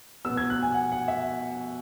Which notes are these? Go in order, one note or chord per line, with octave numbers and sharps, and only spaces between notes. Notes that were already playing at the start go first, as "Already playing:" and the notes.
B2 B3 E6
G#6
F#6
G#5
F#5
F#5
E5